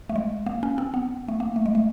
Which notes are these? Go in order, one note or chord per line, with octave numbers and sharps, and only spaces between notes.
A3
G#3
A#3
C#4
C4
B3
A3
A#3
A3
G#3
A3